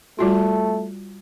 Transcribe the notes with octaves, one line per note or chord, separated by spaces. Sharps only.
G3 A3 F4 F#4